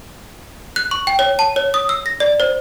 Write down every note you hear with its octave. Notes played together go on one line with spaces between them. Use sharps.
F#6
C#6
G5
C#5
A5
C#5
D#6
E6
A#6
D5
C5